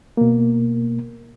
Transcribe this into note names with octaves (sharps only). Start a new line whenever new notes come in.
B2 A#3